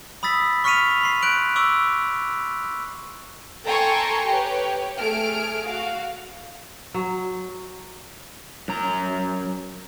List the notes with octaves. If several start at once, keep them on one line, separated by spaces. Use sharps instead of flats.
B5 D#6 E6 A6 B6
C#6 F6 B6 C#7 D#7 F7
B5 C6 C7
F#6 G6 D7 F#7
C#6 D6 E6 F#7
A4 G5 G#5 A#5 C6 C#6
G4 B4 C#5
A3 G#4 F6 D7
F#4 F5
F#3
F#2 A#5